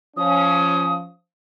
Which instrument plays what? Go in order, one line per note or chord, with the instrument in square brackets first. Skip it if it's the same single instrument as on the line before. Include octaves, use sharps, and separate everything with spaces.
[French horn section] F3 C#4 [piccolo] D#6